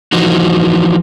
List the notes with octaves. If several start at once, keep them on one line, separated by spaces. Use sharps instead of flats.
E3 F3 D#4 F#4